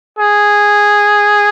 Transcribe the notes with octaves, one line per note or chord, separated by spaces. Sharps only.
G#4